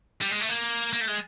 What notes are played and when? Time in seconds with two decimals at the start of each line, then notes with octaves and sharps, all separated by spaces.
0.21 G3
0.31 G#3
0.40 A3
0.49 A#3
0.93 A#3
1.01 A3
1.08 G#3